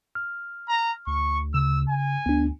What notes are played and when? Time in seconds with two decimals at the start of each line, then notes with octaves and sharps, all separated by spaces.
0.15 F6
0.69 A#5
1.07 D2 C#6
1.54 C#3 E6
1.89 G#5
2.26 D2 B3 D4